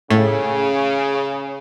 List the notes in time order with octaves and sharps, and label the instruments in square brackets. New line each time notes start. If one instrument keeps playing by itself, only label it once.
[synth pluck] A2 [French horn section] C#3